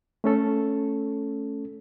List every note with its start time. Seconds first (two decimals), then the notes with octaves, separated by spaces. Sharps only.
0.24 A3 C#4 A4